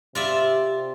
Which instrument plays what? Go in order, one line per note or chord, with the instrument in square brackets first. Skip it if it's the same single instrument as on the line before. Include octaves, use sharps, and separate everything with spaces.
[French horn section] C3 G4 [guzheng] F4 D5 E5